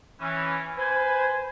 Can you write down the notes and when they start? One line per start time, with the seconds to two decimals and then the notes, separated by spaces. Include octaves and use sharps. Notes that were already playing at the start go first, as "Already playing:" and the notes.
0.20 E3 C#4
0.77 B4 C5 G#5